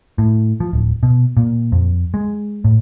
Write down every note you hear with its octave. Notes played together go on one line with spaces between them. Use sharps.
A2
F3
D1
B2
A#2
F2
G#3
A2